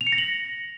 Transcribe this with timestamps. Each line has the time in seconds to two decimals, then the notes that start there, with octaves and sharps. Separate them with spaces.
0.01 F7
0.07 C#7
0.12 A#6
0.18 F#7